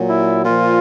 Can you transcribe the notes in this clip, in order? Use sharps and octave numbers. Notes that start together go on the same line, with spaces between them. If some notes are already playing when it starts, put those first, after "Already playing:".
Already playing: A#2 F#3
E4
A#2 F3 F4